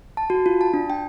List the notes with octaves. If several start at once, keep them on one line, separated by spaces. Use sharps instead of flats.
A5
F#4
F4
A5
D4
G5